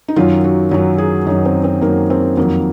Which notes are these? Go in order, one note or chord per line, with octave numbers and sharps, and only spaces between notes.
D#4
F#2 D#3 F#3 F4
F#4
F#2 D#3 F#3 F#4
G#4
F#2 D#3 F#3 D#4
C4
C4
F#2 D#3 F#3 A#3
C4
F2 D#3 F#3 A#3